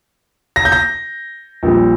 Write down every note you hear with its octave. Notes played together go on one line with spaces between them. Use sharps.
A#6
G6
A#6
A#1 A#2 G3